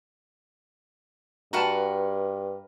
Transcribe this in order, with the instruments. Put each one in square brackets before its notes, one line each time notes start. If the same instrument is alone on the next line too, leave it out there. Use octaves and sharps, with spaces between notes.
[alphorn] G2 [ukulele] F#4 G5 A5 [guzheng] A#4 B4 F#5